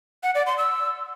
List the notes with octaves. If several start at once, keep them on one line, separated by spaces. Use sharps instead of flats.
F#5
D5
C6
E6